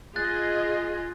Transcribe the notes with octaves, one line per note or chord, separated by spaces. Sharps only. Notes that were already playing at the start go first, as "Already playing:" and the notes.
F4 G#4 D#5 F#6 A6